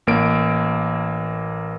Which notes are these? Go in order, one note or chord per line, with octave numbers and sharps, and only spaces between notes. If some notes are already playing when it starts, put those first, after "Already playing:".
A1 A#3 D7